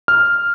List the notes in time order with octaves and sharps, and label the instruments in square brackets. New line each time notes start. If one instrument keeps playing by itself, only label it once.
[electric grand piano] F6